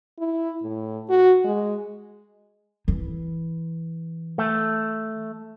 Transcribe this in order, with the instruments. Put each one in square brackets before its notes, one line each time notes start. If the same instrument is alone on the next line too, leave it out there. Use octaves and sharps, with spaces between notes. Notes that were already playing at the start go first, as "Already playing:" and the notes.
[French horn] E4
A2
F#4
G#3
[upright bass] E3
[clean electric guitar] A3